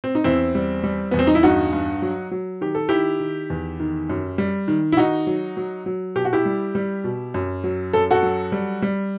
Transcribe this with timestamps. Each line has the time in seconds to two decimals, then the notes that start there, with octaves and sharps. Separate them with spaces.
0.04 C4
0.15 D#4
0.24 E2 C4 E4
0.55 G3
0.84 G3
1.11 E2 B3
1.19 C4
1.27 D#4
1.35 E4
1.43 G2 D#4 F#4
1.72 G2
2.02 F#3
2.31 F#3
2.61 D#3 G4
2.75 A4
2.89 D#3 E4 G4
3.20 D#3
3.50 E2
3.80 D#3
4.09 F#2
4.38 G3
4.68 D#3
4.92 E4
4.97 D#3 D#4 F#4
5.27 F#3
5.57 F#3
5.86 F#3
6.15 B2 G4
6.25 F#4
6.33 E4 G4
6.45 G3
6.75 G3
7.04 B2
7.34 F#2
7.64 F#3
7.93 F#2 A4
8.11 F#4 A4
8.23 F#3
8.52 G3
8.82 G3